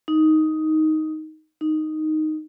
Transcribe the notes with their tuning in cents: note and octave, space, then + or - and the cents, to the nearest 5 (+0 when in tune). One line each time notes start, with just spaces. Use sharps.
D#4 +5
D#4 -5